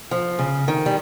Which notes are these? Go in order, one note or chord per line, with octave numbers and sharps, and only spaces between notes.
F3
C#3
D#3
G3